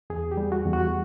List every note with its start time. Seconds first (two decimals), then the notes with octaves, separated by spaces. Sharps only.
0.10 E2 G#4
0.31 G4
0.37 G3
0.52 F#4
0.66 E2
0.73 F#4